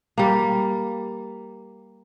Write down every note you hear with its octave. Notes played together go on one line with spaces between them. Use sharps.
G3 A#3